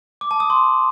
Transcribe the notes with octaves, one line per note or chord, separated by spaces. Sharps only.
D6
A5
D#6
C6